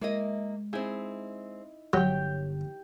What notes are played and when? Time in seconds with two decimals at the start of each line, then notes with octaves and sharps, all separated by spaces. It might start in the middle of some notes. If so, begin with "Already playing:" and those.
0.01 G#3 A#3 E4 D#5
0.73 C4 D#4 E4 G#4
1.93 G1 F#3 G4 C#5 G5